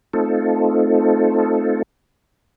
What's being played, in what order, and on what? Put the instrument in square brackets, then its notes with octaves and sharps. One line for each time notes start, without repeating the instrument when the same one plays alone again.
[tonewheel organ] A3 C4 D#4 F4 A4